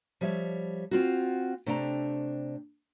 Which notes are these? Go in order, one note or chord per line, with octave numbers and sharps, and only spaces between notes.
F3 G3 C#5 E5
C4 F4 F#4
C3 A3 C4 D4 C#5 A#5